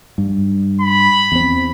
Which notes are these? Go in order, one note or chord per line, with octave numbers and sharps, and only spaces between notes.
G2
B5
E2 C4